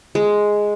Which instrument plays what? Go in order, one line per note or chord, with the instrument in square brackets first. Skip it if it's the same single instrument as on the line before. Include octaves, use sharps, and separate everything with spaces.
[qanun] G#3